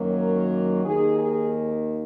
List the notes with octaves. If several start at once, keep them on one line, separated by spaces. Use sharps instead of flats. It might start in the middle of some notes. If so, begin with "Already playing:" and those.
Already playing: F#2 D#3 F#3 A#3
A#4
D#2 D#3 A#3 G#4
G#4